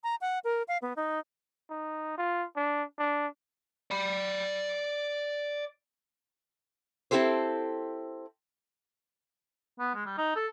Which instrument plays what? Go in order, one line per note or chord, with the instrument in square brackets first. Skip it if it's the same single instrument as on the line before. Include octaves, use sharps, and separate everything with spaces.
[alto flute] A#5
F#5
A#4
F5
B3
D#4
[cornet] D#4
F4
D4
D4
[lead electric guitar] D5 B5
[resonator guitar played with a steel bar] C4 E4 G4 A4 C5
[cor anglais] B3
G#3
G3
D#4
A4